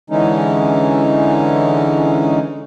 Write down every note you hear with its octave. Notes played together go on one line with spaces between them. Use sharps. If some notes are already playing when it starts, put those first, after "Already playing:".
D3 E3 G#3 C#4 D#4